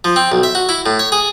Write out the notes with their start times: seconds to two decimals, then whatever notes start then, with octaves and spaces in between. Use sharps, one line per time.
0.04 F3
0.16 C4
0.32 B1
0.43 E5
0.55 F#4
0.69 E4
0.86 A2
0.99 C#5
1.12 G#4